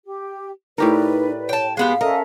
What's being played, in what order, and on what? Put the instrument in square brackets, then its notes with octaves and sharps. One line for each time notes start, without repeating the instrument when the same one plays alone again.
[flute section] G4
[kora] A2 G4 A#4 [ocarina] D#4 [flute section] B4 D5
[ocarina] C#5 [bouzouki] G5 A5
[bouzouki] G#3 B3 G4 [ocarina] F5
[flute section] C#4 A4 E5 [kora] A#4 [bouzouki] D#5